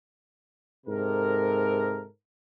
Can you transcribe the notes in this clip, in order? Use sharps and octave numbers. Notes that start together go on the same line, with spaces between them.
G#2 C3 A4 A#4